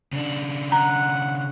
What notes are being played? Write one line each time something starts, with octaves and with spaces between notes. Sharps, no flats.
C#3 D4
F#5 A#5